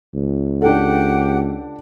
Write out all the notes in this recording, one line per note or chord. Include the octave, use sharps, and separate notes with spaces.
C#2
D4 G4 A4 F#5 G5